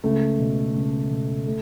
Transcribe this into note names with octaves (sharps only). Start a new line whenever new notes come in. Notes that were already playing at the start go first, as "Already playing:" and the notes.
C#2 A3
B2
C#2
B2
A3